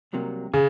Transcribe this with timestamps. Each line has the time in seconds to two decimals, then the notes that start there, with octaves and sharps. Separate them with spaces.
0.13 C2 C3 F#3 A#3
0.54 C#3 G#4